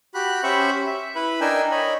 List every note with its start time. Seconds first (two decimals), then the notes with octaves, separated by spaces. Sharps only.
0.14 F#4 G4 B5 F#6
0.43 C#4 G4 C5 E5 B5 C#6
0.87 E5
1.15 E4 B4 B5
1.41 D4 D#4 A#4 G5 G#5 E6
1.71 C#5 D#5 B5